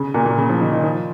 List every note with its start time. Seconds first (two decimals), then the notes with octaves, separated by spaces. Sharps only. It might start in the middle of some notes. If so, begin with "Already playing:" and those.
Already playing: C#3
0.14 A#2
0.26 A#2
0.38 C#3
0.49 F3
0.60 D#3
0.71 D#3
0.83 F3